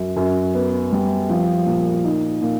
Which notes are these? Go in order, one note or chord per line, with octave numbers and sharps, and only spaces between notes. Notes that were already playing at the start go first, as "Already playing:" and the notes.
Already playing: F#2
F#2
B3
G3
F3
A#2
D#4
A#2